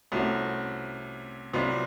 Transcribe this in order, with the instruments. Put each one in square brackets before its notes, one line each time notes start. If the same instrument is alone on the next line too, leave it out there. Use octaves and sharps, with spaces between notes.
[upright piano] C2 C3 [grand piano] A3 C#4 F#4
[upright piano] C2 C3 [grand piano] F#3 B3 D4 F4